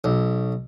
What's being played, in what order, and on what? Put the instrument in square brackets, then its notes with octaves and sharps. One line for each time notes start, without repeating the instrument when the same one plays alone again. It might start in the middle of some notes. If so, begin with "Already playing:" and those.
[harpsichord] B1